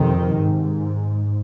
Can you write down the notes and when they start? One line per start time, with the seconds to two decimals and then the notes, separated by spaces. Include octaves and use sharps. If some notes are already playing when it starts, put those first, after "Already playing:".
Already playing: F2 C3 D#3
0.36 G#2